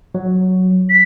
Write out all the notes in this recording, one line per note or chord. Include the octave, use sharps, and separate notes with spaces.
F#3
B6